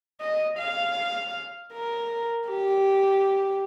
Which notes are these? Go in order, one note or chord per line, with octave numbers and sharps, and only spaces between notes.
D#5
F5
A#4
G4